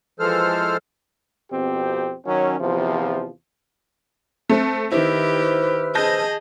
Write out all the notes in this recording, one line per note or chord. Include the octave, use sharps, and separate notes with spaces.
E3 F3 G#3 A4 C5 F6
F2 B2 C4 G4
D#3 F#3 C#4
E2 C3 F3
A3 C4 F#6
D#3 E4 G4 B4 C5 E6 F6
G#4 D#5 A5 G6 A#6